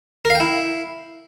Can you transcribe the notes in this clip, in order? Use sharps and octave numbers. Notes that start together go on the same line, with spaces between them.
A#4
F5
G5
E4